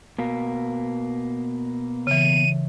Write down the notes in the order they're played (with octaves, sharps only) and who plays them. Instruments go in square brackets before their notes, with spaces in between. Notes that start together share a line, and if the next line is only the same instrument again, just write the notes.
[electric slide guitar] B2 A#3
[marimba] C#3 E3 [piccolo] D#7